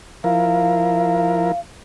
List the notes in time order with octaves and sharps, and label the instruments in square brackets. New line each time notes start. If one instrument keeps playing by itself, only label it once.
[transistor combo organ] F3 E4 A#4 [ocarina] F5